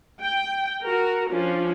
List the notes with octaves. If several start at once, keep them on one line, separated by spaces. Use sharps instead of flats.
G5
F#4 A#4
F3 C#4 D4 F4